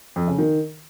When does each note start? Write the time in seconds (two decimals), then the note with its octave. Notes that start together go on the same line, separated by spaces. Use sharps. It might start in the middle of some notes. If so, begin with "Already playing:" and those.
0.16 F2
0.27 C#3
0.38 D#3